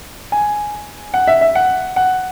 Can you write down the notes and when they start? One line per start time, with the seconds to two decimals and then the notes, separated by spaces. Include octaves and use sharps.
0.32 G#5
1.14 F#5
1.27 E5
1.41 E5
1.55 F#5
1.96 F#5